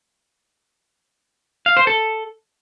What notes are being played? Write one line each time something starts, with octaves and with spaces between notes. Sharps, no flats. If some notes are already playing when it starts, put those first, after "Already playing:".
F5
C5
A4